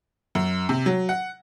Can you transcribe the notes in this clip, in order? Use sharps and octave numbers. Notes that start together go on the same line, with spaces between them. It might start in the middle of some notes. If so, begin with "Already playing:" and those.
F#2
C3
F#3
F#5